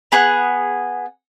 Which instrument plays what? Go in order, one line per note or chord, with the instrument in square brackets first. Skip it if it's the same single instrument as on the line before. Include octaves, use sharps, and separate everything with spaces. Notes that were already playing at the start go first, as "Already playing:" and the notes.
[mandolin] B3 G#4 F#5 F#6